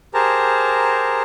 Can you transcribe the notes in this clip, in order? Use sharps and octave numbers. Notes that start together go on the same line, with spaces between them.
G4 G#4 A#4 C5 A5 A#5